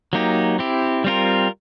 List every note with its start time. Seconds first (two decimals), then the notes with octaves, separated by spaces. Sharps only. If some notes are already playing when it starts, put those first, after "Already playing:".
0.13 F#3 A#3 D#4 G4
0.59 C4 E4 G4
1.04 G3 C4 F4 A#4